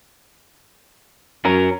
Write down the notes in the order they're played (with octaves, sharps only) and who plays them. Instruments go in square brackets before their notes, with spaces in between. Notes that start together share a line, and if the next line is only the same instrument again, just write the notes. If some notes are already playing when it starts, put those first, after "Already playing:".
[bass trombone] F#2 [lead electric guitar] C#4 A#4